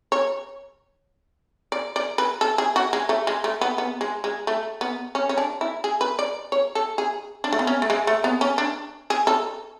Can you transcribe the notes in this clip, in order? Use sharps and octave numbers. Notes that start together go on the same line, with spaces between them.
C#5
D5
D5
B4
A4
G#4
F#4
G#3
A3
G#3
A3
B3
B3
G#3
G#3
A3
B3
C#4
C#4
D4
E4
G#4
B4
D5
C#5
A4
G#4
D4
A3
B3
C#4
A3
G#3
A3
B3
C#4
D4
G#4
A4